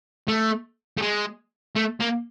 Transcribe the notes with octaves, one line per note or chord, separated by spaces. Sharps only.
A3
A3
G#3
A3
A#3